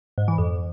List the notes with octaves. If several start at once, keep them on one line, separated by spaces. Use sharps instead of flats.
G#2
E3
F2